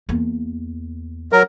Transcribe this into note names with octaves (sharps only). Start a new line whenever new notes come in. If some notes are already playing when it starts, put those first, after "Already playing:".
E2 A#3
F#3 A#4